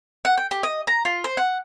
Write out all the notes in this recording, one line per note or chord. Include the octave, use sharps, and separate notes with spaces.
F#5
G5
G4
D#5
A#5
F4
C5
F#5